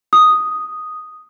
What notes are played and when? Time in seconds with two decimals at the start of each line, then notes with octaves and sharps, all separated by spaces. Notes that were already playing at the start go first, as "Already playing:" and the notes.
0.13 D#6